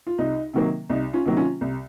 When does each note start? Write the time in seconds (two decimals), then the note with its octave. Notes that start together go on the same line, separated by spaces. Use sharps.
0.07 F4
0.18 C2 D#4
0.53 C3 D#3 F#3 A#3
0.89 C2 D#4
1.13 C#4 F4
1.25 C3 D#3 F#3 A#3
1.37 C#4 F4
1.61 C2